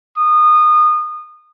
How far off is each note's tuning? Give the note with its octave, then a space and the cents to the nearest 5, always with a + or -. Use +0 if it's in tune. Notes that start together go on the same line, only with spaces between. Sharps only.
D#6 -25